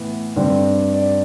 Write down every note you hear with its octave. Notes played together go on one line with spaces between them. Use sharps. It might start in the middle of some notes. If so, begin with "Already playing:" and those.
Already playing: A2 E3 B3
G2 D3 G3 C4
D5